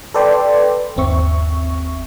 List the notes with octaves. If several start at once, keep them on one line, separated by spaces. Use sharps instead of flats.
A4 B4 D5 G5 C6
G1 D#2 C4 E5 C#6